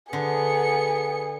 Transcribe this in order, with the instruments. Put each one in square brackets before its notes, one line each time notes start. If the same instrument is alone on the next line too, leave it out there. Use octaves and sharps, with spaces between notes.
[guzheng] D3 [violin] B3 C#7 [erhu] G#4